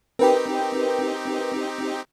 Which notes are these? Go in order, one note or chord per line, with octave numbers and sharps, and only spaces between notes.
C4 D#4 G4 A#4 B4 G5